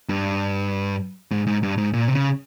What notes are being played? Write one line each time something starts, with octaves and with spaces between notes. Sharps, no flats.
G2
G#2
G#2
G2
G#2
A#2
C3
C#3